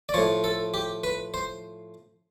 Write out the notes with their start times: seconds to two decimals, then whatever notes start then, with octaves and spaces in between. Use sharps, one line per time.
0.09 D5
0.14 A2 F3 C#5
0.44 A4
0.74 G4
1.04 B4
1.34 C5